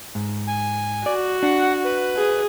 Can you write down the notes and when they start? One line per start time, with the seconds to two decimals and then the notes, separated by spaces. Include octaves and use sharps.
0.15 G#2
0.47 G#5
1.06 F#4 D5
1.43 D4 F#5
1.84 B4
2.16 G#4